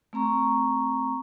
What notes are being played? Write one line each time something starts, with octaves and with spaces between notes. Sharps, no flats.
A3 C4 A#5 C#6